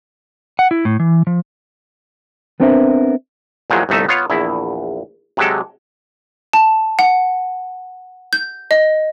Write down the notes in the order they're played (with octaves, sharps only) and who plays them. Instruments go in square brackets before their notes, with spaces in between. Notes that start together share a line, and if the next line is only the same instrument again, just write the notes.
[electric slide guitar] F#5
E4
A2
E3
F3
[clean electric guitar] B3 C4 D4 A#4 C5 E5
[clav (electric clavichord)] E2 A#2 F3 F#3 G#3
G1 C2 A3 D#4 E5
B3 F4 C#5 F5
A#1 E2 E4
C3 F#3 G#3 G4 A4
[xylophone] A5
F#5
G6
D#5